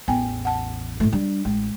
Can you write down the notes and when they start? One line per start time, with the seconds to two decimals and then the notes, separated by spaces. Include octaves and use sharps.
0.08 A1 E2 B3 G5 G#5
0.45 F#5 A5
1.00 A2 A3
1.12 G3 D4
1.45 A1 G#3